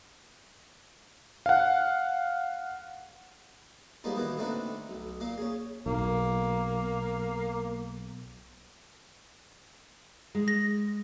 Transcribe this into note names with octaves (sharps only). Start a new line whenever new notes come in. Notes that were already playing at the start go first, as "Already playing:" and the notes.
F5 F#5
F3 G3 G#3 A#3 B3 D#4
B2 D#3 E3 A#3 E4
D3 A3 C4 D#4 B4
B1
A#2 A#3 F5
C#4 G#4
B1 A#3
G#3
A#6